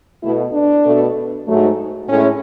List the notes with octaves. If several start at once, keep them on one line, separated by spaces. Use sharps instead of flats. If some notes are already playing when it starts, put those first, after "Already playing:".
B2 A3 E4
D4
B2 A3
G#2 F#3 A3
A2 G#3 C#4